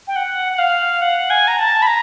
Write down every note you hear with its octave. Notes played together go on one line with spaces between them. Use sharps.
G5
F#5
F#5
F5
F#5
G#5
A#5
A5
B5
A#5